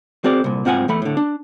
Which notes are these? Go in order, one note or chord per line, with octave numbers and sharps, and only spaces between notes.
C4 F#4 G#4 A#4 D5
C2 A#2
G#2 C4 F4 F#5 G#5
E2 A3 B5
A2 D3
D4